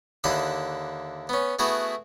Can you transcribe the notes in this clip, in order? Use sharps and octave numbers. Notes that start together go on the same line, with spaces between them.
D#2 D3 E4 F#5 D#6
B3 C#4
A3 B3 E4 F#4 G#4